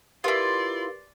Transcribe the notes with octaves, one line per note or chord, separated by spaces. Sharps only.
E4 F4 G4 A#4 B4 D5 C6